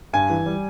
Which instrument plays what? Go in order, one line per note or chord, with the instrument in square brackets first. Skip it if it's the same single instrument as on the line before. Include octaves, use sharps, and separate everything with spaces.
[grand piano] G2 [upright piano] G#5
[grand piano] E3
G3